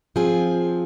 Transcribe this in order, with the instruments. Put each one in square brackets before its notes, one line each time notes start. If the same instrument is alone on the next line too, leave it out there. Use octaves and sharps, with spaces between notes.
[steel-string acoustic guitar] F3 C4 F4 G#4